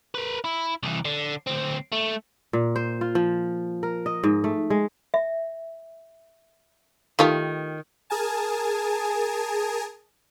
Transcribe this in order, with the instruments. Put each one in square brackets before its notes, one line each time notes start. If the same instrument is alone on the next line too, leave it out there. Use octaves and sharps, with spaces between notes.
[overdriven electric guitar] A#4 B4
E4
C2 E3
D3
D2 C4
A3
[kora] A#2
C5
F4
F3
A#4
D#5
G#2
A3
G#3
[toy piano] E5
[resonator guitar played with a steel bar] D#3 [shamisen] A3 F4 G4
[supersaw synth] G#4 A#4 G#5 A5